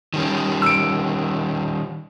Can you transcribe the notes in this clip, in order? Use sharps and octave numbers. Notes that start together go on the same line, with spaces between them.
D#3 G3 C#4
E6 D7